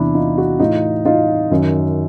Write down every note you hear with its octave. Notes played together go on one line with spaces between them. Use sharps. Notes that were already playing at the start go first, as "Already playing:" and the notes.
Already playing: E2 C3 E3 D4 E4
D#4 F4
E4 F#4
A2 E3 D#4 F4
D#4 F4
F#2 D#3